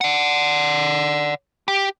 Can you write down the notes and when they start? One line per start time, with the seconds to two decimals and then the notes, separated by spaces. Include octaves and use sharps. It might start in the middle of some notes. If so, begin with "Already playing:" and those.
0.01 D5 F#5
1.68 G4